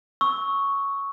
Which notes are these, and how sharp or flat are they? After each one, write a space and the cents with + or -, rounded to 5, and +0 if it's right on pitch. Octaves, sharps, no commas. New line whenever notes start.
C#6 +0 E6 -25